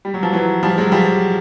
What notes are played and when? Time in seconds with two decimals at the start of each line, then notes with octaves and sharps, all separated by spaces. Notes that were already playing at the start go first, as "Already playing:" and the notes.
0.05 G3
0.14 F#3
0.23 F3
0.33 E3 F#3
0.63 F3 G3
0.78 F#3 G#3
0.92 F3 G3